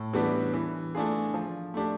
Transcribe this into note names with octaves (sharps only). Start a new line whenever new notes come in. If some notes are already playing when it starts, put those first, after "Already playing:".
Already playing: A2
E3 G3 B3 D4
E3
A3 D4 F4 G#4
F3
A3 D4 G4